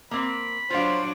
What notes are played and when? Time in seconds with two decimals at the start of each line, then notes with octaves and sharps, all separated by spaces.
0.11 A#3 C4 B5
0.70 F#3 D4 F4 C5 F5